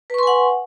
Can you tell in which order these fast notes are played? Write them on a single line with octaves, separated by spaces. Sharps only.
B4 C#6 C6 G#5 F#5